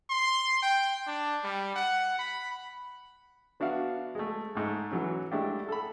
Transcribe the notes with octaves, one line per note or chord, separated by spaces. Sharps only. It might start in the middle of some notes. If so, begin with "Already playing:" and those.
C6
G5
D4
G3
F#5
B5
B3 D4 F#4 E5 F5
G#3 A3
G#2 A3
E3 F#3 C#4
G#3 A3 D4 E4 G4
A4 B5